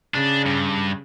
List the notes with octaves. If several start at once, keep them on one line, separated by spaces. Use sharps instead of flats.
C#3 D4
G2